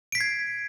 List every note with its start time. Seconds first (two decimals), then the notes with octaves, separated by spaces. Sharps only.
0.12 D7
0.15 B6
0.18 C7
0.21 G#6